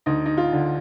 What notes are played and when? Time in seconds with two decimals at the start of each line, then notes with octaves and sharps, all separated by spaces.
0.06 D2 D#4
0.26 D#4
0.37 F4
0.52 D3